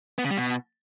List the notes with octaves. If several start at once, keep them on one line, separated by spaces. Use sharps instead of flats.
B3
C#3
G3
B2